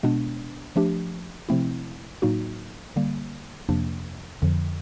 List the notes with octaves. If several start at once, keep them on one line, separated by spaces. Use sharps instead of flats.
B2 G#3 B3 D4
F3 A3 D4 G4
C3 F3 A3 C4 E4
A2 F#3 A#3 D#4 F#4
D3 G3 A#3
F2 C3 F3 A#3 D4
F2 D3 F3